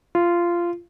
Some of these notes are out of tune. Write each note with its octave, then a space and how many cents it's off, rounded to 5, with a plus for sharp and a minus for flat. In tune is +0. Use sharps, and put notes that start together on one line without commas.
F4 -15